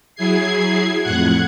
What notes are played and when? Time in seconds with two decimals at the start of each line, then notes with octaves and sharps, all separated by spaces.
0.15 F#3 E4 G#4 G#6 C7
1.01 F2 A2 F#5 F#6 G#6